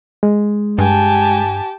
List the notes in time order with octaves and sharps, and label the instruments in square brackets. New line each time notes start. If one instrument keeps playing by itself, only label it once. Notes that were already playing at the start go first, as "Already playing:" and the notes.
[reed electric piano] G#3
[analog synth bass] G2 [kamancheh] G4 A5 [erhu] G#5